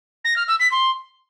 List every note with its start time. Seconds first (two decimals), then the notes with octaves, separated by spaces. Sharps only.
0.25 A#6
0.36 F6
0.48 E6
0.60 B6
0.72 C6